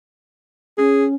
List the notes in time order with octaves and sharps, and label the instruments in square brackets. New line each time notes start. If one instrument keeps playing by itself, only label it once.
[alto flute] C#4 [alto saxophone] G#4